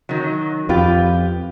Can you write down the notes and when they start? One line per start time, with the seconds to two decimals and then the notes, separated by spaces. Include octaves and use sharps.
0.09 D#3 F#3
0.69 F2 F4 G4 B4